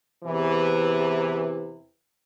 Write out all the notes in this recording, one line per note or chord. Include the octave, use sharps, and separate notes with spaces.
E2 C3 E3